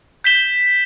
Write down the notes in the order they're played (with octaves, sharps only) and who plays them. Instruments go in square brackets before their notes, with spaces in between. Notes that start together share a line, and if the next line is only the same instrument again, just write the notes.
[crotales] G6 B6 E7 G7